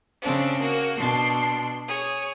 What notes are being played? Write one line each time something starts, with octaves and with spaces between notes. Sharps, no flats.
C#3 C4 D4
A#3 F#4
B2 D4 C6
G#4 C#5